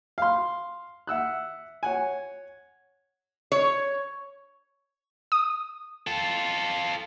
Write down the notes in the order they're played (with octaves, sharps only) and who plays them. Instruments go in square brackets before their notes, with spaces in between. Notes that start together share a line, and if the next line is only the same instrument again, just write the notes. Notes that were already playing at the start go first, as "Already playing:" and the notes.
[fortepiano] F5 C6
E5 F#5 E6 F#6
C#5 F#5 G#5
[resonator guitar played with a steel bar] C#5
[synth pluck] D#6
[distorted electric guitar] F4 A4